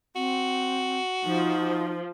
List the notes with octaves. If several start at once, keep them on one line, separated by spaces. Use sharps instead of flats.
C4 F#4
F3 D#4